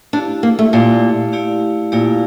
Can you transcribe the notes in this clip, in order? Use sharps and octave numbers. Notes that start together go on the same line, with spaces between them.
A3 D4 E4 G4 D5 F5
A#3
A3
A#2 A3 E4 G4 D5 F5
A3 E4 G4 D5 F5
A#2 A3 E4 G4 D5 F5